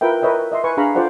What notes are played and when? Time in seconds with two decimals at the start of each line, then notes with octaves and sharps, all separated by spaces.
0.01 F4 A#4 B4 E5 G5
0.22 A#4 B4 C#5 D#5 E5 G5
0.52 D#5 E5 C6
0.64 B4 G#5 C#6
0.77 D4 G#4 F5 A#5 B5 C#6
0.95 F4 G4 A4 C5 D5 F#5